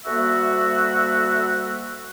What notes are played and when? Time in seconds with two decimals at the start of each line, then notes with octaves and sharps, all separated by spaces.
0.06 D2 G3 A#3 F#4 E5